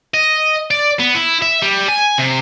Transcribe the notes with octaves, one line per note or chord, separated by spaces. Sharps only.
D#5
D5
B3
E4
E5
G3
G#5
C3